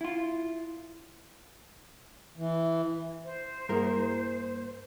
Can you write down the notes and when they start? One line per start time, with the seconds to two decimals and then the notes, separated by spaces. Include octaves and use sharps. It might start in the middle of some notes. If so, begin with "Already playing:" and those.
0.01 E4 F4
2.37 E3
3.25 C5
3.69 G2 G3 A#3 E4 F#4 G#4 A#4